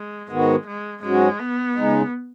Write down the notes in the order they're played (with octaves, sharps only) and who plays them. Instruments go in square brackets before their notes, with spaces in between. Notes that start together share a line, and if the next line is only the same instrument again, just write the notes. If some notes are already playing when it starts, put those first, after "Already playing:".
Already playing: [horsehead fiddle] G#3
[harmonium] G#2 D#3 B3 F#4 [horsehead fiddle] G#3
[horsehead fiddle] G#3
[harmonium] G#2 F#3 C#4 F#4 [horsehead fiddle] G#3
[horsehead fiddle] B3
[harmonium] C#3 G#3 D#4